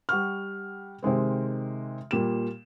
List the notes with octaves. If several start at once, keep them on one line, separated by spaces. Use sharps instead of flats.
G3 F#5 C#6 F6
C3 D#3 G#3 C4
A#2 G3 E7